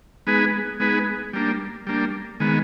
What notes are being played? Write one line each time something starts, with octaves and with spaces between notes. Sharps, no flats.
G#3 B3 D#4 G#4 B4
G#3 B3 D#4 G#4 B4
G3 A#3 D4
G3 A#3 D4
D#3 G#3 B3